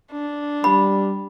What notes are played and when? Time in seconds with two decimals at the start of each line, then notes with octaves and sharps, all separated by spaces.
0.12 D4
0.64 G3 B5